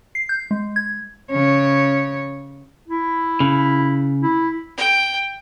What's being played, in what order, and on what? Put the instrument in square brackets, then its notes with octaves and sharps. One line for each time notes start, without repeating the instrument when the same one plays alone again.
[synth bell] C7
G6
G#3
G#6
[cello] C#3 C#5
[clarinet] E4
[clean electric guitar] C#3
[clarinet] E4
[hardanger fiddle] G5